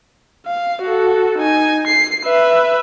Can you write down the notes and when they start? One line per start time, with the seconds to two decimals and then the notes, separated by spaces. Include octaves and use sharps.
0.46 F5
0.82 F#4 A4
1.38 D#4 G#5
1.87 C7
2.25 B4 E5